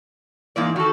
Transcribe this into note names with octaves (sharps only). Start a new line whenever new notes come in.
G#2 E3 A#3 D5
D#3 F#4 A4